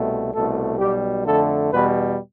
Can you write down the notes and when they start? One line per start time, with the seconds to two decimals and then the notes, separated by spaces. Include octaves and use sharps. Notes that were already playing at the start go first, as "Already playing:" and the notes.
Already playing: C2 B2 A3
0.33 C2 B2 A3 A4
0.79 B1 B2 G3 G4
1.26 F2 D3 A3 A4
1.71 E2 B2 G3 B4